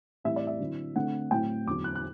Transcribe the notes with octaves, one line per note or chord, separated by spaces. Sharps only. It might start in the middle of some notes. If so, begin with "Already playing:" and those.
A2 E3 G3 C4 E4 E5
D5
E5
D3 F#3 C4 E4
D3 A3 C4 F#5
A2 F#3 C4 E4 G5
E2 D3 F#3 D6
F#6
F#6